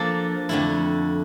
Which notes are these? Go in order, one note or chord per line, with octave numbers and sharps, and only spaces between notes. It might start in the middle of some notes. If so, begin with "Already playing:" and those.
Already playing: F3 A#3 D4 A4 D5
F2 D3 A3 E4